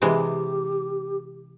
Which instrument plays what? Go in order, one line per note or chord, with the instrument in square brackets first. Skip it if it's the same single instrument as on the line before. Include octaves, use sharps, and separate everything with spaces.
[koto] C3 E3 G#3 [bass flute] G4